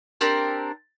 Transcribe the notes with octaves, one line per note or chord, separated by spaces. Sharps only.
C4 D4 G4 A#4